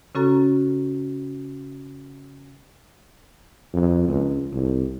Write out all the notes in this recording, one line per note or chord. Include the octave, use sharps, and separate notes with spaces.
C#3 C#4 F#4 A4 A#5
F2
C#2
C2